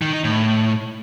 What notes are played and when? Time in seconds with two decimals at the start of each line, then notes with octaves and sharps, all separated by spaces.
0.02 D#3
0.13 D#4
0.24 A2